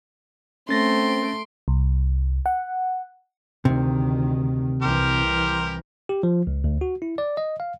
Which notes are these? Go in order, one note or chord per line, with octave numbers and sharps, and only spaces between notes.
A3 C4 C#4 C6 A6 A#6 D7
C2
F#5
D2 C3 D#3
C2 E3 G4 A#4 C5
G4
F3
C#2
D2
F#4
E4
D5
D#5
F5